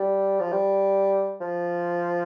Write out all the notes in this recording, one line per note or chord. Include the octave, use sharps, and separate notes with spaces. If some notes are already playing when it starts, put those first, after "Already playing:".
Already playing: G3
F3
G3
F3